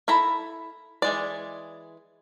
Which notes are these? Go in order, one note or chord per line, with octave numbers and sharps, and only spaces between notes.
E4 A4 A#5 B5
E3 G#3 D5